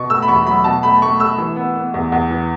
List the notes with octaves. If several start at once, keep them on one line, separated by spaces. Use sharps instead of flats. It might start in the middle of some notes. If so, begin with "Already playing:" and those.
Already playing: B2 B3 C#6
A3 E6
B5
E2 C#6
F#3 B5
B2 A5
A3 B5
A3 C#6
A3 E6
E3
B3
B3
E2
E2
E3